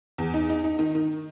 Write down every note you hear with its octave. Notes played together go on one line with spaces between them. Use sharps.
E2
D#4
D#4
D#4
D#3
D#3